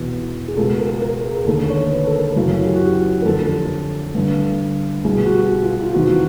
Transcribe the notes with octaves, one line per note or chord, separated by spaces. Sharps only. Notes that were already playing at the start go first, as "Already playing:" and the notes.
Already playing: E2 B2
G#4
C#2 B2 A4
A#4
A#4
G#4
D#2 D3 A4
C#5
B4
A4
A#4
F#2 C#3 E3 F#4
G4
F#4
G4
A#4
F2 D3 A4
G2 D3
C2 B2 G#4
F#4
G4
F4
F4
E2 C3 D#3 F#4
F#4